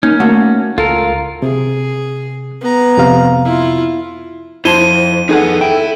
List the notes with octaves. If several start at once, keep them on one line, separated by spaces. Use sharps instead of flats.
A#3 C#4 D#4
A3 F#4 F#5
C#2 F4 A4 A#4
C3 G#4
B3 A#5
F2 C3 F5
E4 F4
F2 E4 C5 A5 C6 D#7 G7
F2 B3 D#4 G#4 A4 F#5
E4 G5